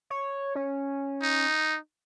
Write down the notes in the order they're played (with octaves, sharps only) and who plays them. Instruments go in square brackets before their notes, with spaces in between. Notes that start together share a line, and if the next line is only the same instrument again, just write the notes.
[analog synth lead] C#5
C#4
[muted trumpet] D#4